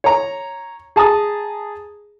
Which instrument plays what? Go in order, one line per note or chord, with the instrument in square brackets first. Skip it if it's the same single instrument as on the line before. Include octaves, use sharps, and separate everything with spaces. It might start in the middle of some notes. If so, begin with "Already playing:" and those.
[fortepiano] C#5 A#5
G#4 A5 A#5 D#6